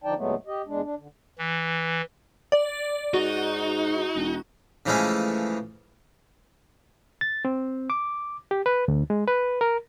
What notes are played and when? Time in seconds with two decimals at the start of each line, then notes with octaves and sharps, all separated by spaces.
0.04 D3 F3 D#4 D5 G5 A5
0.16 D#2 A#2 F#3 G#3 A3 B3
0.47 G4 D#5
0.67 E2 G#3 D4
0.83 D4
0.97 D3
1.38 E3
2.52 D5
3.14 G#2 D#4 F#4
4.15 E1
4.86 C#3 E3 F3 G#3 A3 C#4
7.21 A6
7.45 C4
7.90 D6
8.51 G4
8.66 B4
8.88 D2
9.10 G#3
9.28 B4
9.61 A#4